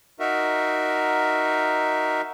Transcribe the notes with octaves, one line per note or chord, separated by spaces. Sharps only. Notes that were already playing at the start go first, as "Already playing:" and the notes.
D#4 F#4 A#4 E5